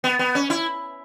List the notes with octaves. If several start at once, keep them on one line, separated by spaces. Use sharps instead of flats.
B3
B3
C#4
E4